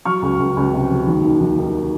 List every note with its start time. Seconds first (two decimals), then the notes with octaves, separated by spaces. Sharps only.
0.05 F#3 C#6 F6
0.22 C#2
0.39 C#2
0.57 C#2
0.73 C3
0.91 F#3
1.07 D#2
1.24 D#3
1.40 D#2
1.58 D#3